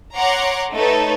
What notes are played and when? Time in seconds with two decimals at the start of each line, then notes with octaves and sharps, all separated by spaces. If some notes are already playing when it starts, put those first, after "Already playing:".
0.15 C#5 F#5 A#5 C6 D6
0.73 A3 D#4 A4 B4 C#5